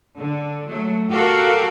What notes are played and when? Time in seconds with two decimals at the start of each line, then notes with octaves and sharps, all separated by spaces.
0.19 D3
0.70 F#3 A3
1.12 F#4 G4 A4 A#4 F5